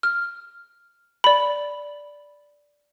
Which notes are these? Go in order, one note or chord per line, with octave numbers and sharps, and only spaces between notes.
F6
D5 B5